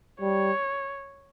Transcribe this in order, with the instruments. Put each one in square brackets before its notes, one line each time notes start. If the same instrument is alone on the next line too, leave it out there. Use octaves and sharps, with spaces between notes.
[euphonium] G3 [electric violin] C#5